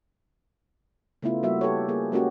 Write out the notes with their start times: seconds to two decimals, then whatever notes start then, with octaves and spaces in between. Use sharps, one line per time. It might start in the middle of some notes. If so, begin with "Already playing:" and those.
1.22 C#3 A3 B3 E4 F4
1.43 G3 A#3 F#4 E5
1.61 G4 A4 B4 C#5
1.89 A#3 G#4
2.12 G#3 A#3 C#4 F#4 G4